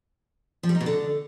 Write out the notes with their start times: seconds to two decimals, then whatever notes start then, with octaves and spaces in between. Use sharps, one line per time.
0.63 F3
0.69 G3
0.75 D#4
0.80 B2
0.86 D3